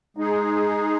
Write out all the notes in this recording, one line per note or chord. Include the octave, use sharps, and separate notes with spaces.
G#3 D#4 G#4